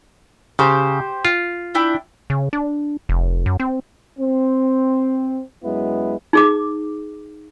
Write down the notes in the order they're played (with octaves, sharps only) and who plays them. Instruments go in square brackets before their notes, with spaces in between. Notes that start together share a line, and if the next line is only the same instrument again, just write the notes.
[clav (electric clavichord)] C#3 [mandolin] G4 C5
[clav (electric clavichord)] F4
[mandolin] D4 E4 G5
[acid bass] C#3
D4
F1
F#2
C4
[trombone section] C4
F#2 G#3 B3 E4
[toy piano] D#4 G#4 D6